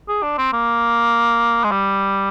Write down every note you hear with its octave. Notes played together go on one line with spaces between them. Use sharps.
G#4
D4
C4
A#3
G#3
G3